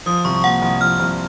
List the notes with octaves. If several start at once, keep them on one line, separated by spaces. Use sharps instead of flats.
F3 D#6
C2 C#6
A#2 F#5
C2
F3 F6
C2